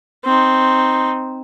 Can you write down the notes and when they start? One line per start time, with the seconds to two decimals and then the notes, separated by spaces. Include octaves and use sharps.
0.24 C4 D#4